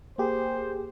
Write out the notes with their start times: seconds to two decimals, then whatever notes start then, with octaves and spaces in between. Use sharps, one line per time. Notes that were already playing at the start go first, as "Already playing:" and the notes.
0.18 A#3 G4 G#4 C5